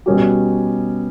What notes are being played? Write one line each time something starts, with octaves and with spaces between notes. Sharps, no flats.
B2 G3 C#4 G4